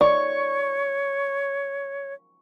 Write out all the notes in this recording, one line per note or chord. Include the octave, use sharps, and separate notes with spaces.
C#5 D5 C#6